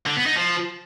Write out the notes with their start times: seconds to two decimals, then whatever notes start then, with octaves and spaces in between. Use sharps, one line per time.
0.07 D3
0.16 B3
0.26 D#4
0.36 F3